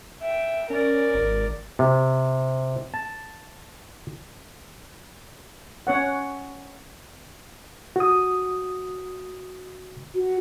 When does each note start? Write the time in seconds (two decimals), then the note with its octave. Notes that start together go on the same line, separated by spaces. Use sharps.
0.22 E5 G5
0.70 C#4 A#4 D5
1.14 G#1
1.79 C3
2.94 A5
5.87 C#4 C#5 F#5
7.96 F#4 D#6
10.15 F#4